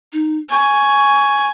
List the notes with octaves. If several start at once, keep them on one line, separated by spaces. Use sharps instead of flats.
D#4
G#5 C#6